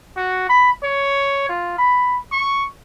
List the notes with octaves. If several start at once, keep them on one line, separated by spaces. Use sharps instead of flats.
F#4
B5
C#5
F4
B5
C#6